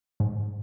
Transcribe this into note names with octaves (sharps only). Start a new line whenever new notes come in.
G#2